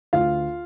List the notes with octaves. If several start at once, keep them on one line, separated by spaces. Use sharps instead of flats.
D2 F4 F5